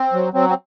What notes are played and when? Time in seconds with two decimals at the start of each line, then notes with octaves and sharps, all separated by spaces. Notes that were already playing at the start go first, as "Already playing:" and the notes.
Already playing: C4
0.13 F#3
0.34 F#3 C4
0.49 C4